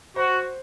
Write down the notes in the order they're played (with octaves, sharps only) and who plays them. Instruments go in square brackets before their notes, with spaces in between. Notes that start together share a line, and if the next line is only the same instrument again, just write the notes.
[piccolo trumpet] F#4 [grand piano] C5